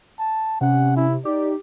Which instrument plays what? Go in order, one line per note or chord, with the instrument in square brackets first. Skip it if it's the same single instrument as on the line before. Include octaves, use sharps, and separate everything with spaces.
[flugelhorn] A5
[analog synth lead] C3 [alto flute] C#4 [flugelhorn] F#5
[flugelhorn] E4
[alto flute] D#4 [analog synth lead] G4 [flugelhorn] D5